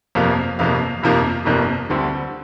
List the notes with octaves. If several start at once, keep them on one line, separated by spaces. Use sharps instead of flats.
G1 F2 C3 F3 A#3 F5
G1 F2 C3 F3 A#3 F5
G1 F2 C3 F3 A#3
G1 F2 C3 F3 A#3
D2 D3 G3 C4